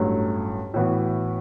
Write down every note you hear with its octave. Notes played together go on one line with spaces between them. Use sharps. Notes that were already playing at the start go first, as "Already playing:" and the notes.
Already playing: A1 G2 F#3 A3
A2 E3 B3 F#4